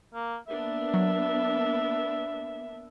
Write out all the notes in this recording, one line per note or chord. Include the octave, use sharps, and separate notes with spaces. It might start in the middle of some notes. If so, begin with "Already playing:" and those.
A#3
A#3 B3 D4 E5
F#3